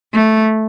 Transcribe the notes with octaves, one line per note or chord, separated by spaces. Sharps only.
A3